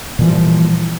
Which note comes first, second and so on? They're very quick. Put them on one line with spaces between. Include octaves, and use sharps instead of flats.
A#2 E3 F3 G3